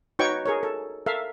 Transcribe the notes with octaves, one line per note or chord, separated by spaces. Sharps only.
D#4 F#4 B4 C#5 G5 C#6
G#4 A#4 C#5
A4
A4 A#4 E5 F5